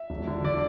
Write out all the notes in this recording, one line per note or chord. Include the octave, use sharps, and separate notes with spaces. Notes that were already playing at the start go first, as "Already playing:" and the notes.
Already playing: E5
E1
D3
D3 D5